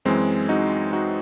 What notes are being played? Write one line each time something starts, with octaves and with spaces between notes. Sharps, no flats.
F#2 E3 G#3 C4
D#4 F#4
D#4 F#4